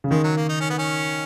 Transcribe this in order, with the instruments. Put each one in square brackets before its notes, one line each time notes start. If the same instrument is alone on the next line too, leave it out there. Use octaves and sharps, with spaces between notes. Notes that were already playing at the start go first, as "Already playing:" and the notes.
[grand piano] C#3
[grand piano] D#3 [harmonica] G#3
[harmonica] F#3
A#3
D#4
C#4
B3
C#4